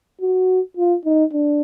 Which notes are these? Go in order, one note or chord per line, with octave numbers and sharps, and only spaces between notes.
F#4
F4
D#4
D4